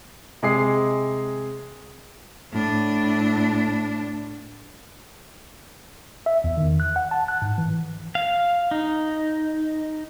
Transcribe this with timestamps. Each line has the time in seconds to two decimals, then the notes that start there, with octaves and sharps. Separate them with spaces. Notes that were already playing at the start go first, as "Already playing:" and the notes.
0.42 C3 G#3 G#5 D#6 C7
2.52 A2 D4
6.26 E5
6.44 E2
6.57 D#3
6.80 F#6
6.96 F#5
7.11 A5
7.28 F#6
7.42 G#2
7.58 E3
8.15 F5
8.71 D#4